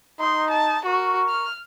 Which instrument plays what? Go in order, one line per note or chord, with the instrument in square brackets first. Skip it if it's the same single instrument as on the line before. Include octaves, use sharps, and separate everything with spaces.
[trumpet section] D#4 [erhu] C6
[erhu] A5
[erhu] F#4 [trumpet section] A#4 C#6
[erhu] F6